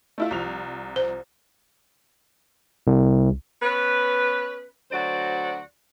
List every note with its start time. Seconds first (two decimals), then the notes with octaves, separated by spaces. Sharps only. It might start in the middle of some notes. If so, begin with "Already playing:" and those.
0.18 A3 E4 F4
0.31 C2 F3 F7
0.96 C5
2.87 C2
3.62 B3 C#4 B4
4.91 D2 F#3 F#4 C5 D5